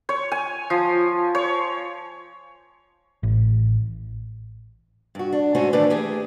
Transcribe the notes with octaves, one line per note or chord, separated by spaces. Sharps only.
C#5
G#5
F3
C#5
A1
G2 F#4
D4
G#2 A3 C#4 F#4 C5 G#5
A2 D#3 E3 A3 D4 B4
A3 G4 G#4